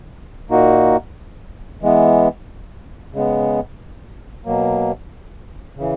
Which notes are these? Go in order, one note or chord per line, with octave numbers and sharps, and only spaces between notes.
A#2 A#3 D#4 F#4
E3 G#3 B3
C#3 G#3 B3
B2 F#3 A#3
C#3 E3